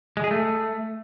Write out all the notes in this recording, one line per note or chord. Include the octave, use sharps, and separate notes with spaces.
G#3
G#4
A3